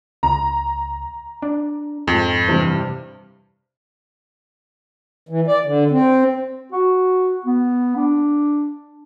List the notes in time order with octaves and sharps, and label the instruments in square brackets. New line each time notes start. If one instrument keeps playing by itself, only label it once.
[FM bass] C#2 [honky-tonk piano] A#5
[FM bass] D4
[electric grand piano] F2 [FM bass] G#2
[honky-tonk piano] G2 C3 [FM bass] E3
[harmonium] E3
D5
D3
C4
[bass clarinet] F#4
B3
D4